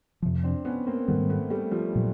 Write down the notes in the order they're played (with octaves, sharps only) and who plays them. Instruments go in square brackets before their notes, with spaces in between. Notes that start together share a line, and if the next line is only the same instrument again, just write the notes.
[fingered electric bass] F2 C3 F3
[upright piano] C4 D4
B3 C#4
A#3 C4
[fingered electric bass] G#2 D#3 G3 [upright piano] A3 B3
[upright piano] A3 B3
G3 A3
F3 G3
[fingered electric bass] A#2 F#3